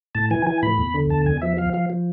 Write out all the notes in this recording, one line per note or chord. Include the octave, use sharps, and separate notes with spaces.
A2 A5
E3 G#5
E3 G#5
A2 B5
E2
D3
E2 A5
E2 G#5
F3 E5
F3 F5
F3 F5
F3